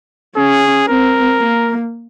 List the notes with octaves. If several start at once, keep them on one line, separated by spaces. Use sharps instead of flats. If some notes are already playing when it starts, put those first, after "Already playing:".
C#4 G#4
C4 A#4
A#3